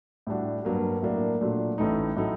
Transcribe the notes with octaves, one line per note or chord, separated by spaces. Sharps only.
A2 G3 D4 F#4
G2 F#3 A#3
A2 F#3 A#3 D4
A#2 F#3 A3 D4
A1 A2 A3 D#4
A2 F#3 A3 D#4